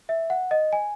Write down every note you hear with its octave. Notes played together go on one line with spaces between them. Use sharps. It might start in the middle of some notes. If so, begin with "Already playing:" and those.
E5
F#5
D#5
G#5